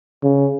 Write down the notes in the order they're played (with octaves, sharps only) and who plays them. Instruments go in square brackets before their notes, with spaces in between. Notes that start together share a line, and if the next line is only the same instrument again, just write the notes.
[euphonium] C#3